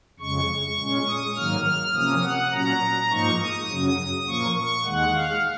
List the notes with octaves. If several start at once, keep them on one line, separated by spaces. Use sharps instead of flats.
F2 C#3 G#3 C#6
A#2 G#3 C#4
D#6
G#2 D#3 F#3 A#3 F6
F6
C3 F3 A#3 C#4 D#6
F#5
A#2 F#3 C#4 A#5
G#2 F3 A#3 D#4 C#6
D#6
F#2 C#3 F#3
A#2 F3 A#3 C#6
C#6
D#2 D#3 G#3 F#5
F5